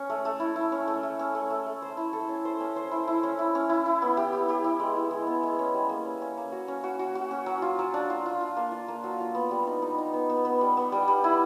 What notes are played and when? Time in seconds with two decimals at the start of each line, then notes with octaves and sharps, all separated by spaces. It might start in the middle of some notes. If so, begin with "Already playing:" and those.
Already playing: C#4
0.10 A3
0.25 A3
0.40 E4
0.56 E4
0.72 C#4
0.88 A3
1.03 A3
1.19 C#4
1.35 A3
1.50 A3
1.66 A3
1.82 C5
1.97 E4
2.13 A4
2.29 C#4
2.45 C5
2.60 C#4
2.76 C5
2.91 E4
3.08 E4
3.23 C#4
3.39 E4
3.55 C#4
3.69 E4
3.86 E4
4.02 B3
4.17 G4
4.33 G4
4.49 G4
4.64 E4
4.80 G#3
4.96 E4
5.11 G#3
5.27 B3
5.43 G#3
5.59 C#4
5.74 G3
5.89 A#3
6.05 C#4
6.22 C#4
6.37 A#3
6.52 F#4
6.68 C#4
6.84 F#4
6.99 F#4
7.15 F#4
7.31 C#4
7.46 F#3
7.62 F4
7.79 F#3
7.94 D4
8.10 F4
8.26 F4
8.40 F4
8.57 A#3
8.72 F4
8.88 A#3
9.04 F#3
9.20 F4
9.35 B3
9.51 G3
9.67 D#4
9.82 D#4
9.98 D#4
10.14 B3
10.29 B3
10.45 B3
10.61 G3
10.77 B3
10.92 G3
11.08 G3
11.24 E4